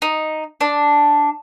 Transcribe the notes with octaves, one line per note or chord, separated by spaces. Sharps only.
D#4
D4